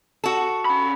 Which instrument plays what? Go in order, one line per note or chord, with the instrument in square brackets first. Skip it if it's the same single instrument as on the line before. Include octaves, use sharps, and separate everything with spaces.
[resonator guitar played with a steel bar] F#4 A4
[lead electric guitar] C#4 B5